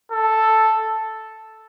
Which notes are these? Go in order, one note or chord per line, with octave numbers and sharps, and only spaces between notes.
A4